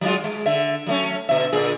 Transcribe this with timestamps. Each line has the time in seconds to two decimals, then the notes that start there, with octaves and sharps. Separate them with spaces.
0.01 F#3 G#3 F4
0.24 G#3
0.46 D3 E5
0.87 F#3 A3 C#4
1.29 B2 D3 E5
1.52 A#2 D3 G#4